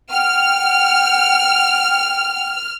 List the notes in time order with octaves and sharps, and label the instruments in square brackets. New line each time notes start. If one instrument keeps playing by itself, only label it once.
[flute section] F#5 G5 [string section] F6